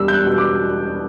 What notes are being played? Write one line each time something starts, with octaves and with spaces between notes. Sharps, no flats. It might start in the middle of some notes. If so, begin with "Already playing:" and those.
Already playing: E1 G3 E6
G6
F#6
B2
D6